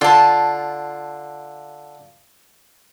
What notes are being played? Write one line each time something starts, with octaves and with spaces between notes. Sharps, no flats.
D3 F4 A5